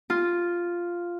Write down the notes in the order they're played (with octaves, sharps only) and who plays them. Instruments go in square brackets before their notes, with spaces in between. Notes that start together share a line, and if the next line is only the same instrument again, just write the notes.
[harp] F4